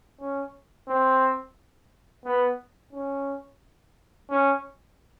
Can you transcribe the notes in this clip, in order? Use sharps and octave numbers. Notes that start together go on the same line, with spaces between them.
C#4
C4
B3
C#4
C#4